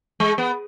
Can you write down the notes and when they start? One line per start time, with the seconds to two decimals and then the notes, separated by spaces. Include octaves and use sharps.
0.20 G#3
0.38 B3